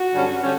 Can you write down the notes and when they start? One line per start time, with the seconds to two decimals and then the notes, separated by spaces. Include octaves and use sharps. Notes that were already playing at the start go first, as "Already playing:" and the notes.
Already playing: F#4
0.14 G2 D3 F#3 C#4
0.43 D3 G3 C#4